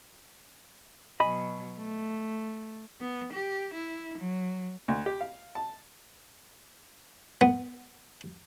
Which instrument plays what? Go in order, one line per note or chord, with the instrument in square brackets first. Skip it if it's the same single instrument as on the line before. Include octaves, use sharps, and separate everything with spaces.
[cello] B2 F#3 [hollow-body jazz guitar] D#5 G#5 B5
[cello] A3
B3
G4
E4
F#3
[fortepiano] D2
G4
F5
A5
[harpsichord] B3